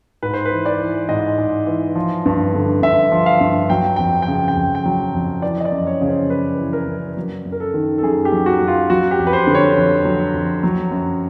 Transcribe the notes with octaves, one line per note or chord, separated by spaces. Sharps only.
G#2 B4
C5
B4
E3
D5
E3
G#2 D#5
G#2
E3
F3
G2
D3
G2 E5
F3
F5
G2
F#3 G5
F2 G5
G5
C#3
G5
F2
G5
F#3
F2
E3 D5
D#5
D5
F#2
C#5
C#3
C5
F#2 B4
E3
A#4
F#2
F#3
F#2
A#4
A4
D#3
A4
F#2 G#4
G4
F#3
F#4
F#2
F4
F#3 F#4
G4
F2
B4
C5
D3
C#5
F2
F#3
F2
F#3
F#2